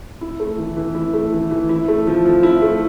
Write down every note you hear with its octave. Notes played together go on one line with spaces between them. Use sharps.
E4
A3
E3
E3
E4
A3
E3
E3
E4
A3
F3
F3
E4
A3